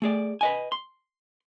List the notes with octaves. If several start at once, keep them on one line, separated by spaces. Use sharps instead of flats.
A3 G#4 D5
B4 D#5 G#5
C6